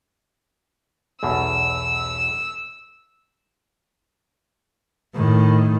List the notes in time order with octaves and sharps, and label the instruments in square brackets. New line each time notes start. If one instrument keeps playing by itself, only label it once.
[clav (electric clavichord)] B1 E2 B2 [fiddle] E6
[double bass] A2 D#3